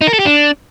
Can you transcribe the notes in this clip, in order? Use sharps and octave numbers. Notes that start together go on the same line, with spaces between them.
D#4
A#4
A4
G4
D4